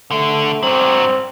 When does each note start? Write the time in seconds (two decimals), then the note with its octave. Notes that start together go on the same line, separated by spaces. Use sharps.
0.11 D3 A3
0.63 G2 F#3 C4